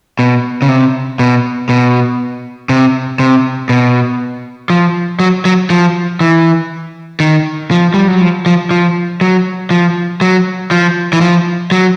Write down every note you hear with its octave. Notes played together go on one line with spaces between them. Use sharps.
B2
C#3
C3
B2
B2
C3
C3
B2
F3
F#3
F#3
F3
E3
D#3
F3
G3
F#3
F3
F3
F3
F#3
F3
F#3
F3
E3
F3
F#3